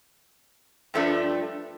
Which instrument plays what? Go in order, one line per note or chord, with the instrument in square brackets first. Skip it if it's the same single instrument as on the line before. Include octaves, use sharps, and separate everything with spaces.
[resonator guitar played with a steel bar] G2 F3 A3 D4